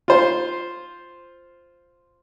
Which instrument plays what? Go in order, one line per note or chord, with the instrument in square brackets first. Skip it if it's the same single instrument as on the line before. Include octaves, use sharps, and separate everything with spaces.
[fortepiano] F4 C5